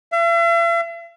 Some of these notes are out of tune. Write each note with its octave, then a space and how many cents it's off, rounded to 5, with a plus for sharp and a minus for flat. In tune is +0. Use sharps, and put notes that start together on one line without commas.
E5 +45